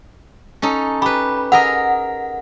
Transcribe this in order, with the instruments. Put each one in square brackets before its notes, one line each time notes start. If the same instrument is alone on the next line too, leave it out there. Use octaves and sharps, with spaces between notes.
[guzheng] C#4 D#4 A4
[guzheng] G4 B4 [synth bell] B5
[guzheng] G#4 A#4 D#5 [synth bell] F#5